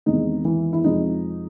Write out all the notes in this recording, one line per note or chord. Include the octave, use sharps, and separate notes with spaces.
E2 C3 D#3 G#3 D#4
E3 E4
E4
F2 C3 F3 G#3 D#4